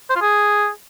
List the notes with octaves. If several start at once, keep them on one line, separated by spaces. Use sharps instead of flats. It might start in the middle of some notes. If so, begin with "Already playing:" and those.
C5
F4
G#4